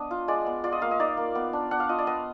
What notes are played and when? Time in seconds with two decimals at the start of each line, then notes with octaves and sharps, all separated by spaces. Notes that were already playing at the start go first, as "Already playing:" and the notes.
Already playing: B3 D4 D#5
0.11 F4
0.28 G#3 D5
0.46 B3
0.64 F4 D5
0.72 D#5
0.81 A#3 F5
0.91 D#5
0.99 D#4 D5
1.17 A#3
1.35 B3
1.53 D4
1.71 D4 F#5
1.80 F5
1.89 F4 D#5
1.99 D5
2.07 B3 D#5